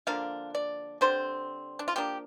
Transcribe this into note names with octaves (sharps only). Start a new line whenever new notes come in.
D3 F3 A#3 D4 F5
D5
D3 G3 C4 C5
D4
F4
F3 A#3 D4 G4